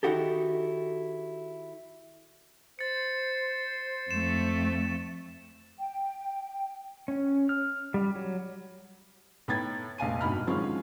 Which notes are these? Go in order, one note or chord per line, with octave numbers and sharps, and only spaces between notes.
D#3 D#4 E4 F#4 G4 A4
C5 A6 C#7
F2 A3 E7
G5
C#4
F6
G3
F#3
A2 B3 D#4 G5 G#6 A6
F1 A#1 F5 G#5 D#7
G#1 G2 B2 D#4 B5 F6
D3 D#3 F3 G#3 C4 C#4